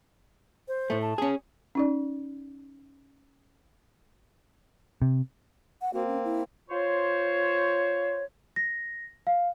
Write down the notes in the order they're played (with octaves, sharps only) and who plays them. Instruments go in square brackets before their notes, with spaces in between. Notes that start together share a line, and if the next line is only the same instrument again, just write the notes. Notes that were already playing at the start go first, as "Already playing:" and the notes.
[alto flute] C5
[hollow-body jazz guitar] A2 A3
[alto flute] A5
[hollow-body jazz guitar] C#4 G#4
[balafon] C#4 D#4 D5
[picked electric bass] C3
[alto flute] F#5
[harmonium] A#3 C4 [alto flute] F#4
[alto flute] C#4
E4
[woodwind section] F4 C5 C#5
[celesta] A#6
F5